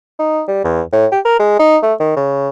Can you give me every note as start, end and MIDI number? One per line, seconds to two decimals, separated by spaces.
0.19 0.42 63
0.48 0.62 55
0.64 0.81 40
0.92 1.06 45
1.12 1.20 67
1.25 1.37 70
1.39 1.56 56
1.59 1.77 63
1.83 1.93 57
2.00 2.15 51
2.16 2.49 49